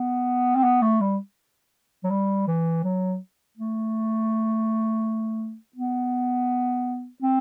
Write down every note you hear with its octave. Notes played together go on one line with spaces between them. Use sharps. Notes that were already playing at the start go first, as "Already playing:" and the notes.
Already playing: B3
C4
B3
A3
G3
F#3
G3
E3
F#3
A3
B3
C4